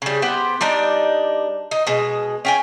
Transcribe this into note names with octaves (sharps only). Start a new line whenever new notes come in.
C#3 G3
B3 G4 C5
G3 D4 D#4 D5
D#4
B2 G#3
C#4 G5 G#5